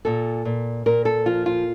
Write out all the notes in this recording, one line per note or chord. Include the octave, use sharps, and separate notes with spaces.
A#2 A4
A#2
A#2 A#4
A4
F3 F4
F4